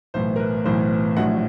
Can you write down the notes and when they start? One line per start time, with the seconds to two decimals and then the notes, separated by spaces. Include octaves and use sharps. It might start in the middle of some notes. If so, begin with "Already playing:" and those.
0.14 B1 A2 E3 C5
0.36 A#4
0.40 B4
0.65 B1 A2 E3 C5
1.17 A#1 A2 F#3 F#5